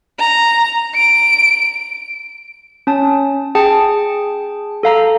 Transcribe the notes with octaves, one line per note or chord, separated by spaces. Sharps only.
A#5
D7
C#4 A5
G#4 G5 A5
A4 F5 A#5